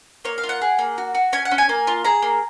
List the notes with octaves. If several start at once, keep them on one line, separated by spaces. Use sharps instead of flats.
A#3 C#5
F5
F4
F#5
G#4
A#3
F#4
F#4
C#4 G#5
F#5
C#4
G#5
A#3
F4
G#4 A#5
A#3